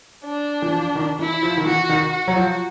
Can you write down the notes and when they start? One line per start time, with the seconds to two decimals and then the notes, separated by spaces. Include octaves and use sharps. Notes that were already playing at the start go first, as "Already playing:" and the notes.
0.25 D4
0.62 E3
0.72 F3
0.95 D#3
1.19 E3 E4
1.43 F3
1.57 D#3
1.66 E3 F#4
1.89 D#3
2.12 F#4
2.28 F#3
2.36 F3